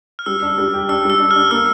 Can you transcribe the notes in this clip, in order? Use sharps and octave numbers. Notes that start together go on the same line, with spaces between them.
F6
G3 E6
D4
G3
G4
D4 E6
G3 E6
D4
F6
D4
A#3 E6